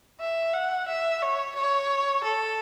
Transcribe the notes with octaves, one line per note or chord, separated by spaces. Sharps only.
E5
F#5
E5
C#5
C#5
A4